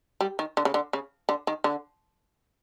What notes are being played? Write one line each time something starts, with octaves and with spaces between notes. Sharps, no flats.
G3
D#3
D3
C#3
D3
C#3
D3
D#3
D3